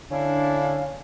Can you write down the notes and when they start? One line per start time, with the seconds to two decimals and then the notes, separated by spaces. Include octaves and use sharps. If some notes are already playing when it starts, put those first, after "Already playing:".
0.11 D3 C#4 D4 E4 F5